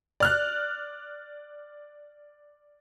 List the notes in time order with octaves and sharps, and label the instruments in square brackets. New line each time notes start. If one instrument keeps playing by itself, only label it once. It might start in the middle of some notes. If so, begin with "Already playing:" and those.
[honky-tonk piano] D5 F6 F#6